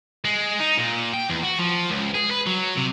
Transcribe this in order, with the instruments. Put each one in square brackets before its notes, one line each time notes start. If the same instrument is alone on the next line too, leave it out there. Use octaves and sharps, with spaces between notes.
[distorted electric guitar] G#3
D#4
A#2
G5
E2
F#4
F3
C#2
G#4
B4
F#3
C3